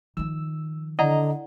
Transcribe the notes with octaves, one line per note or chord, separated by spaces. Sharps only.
D#3 F3 E6
D3 E4 D5 D#5 F#5 A#5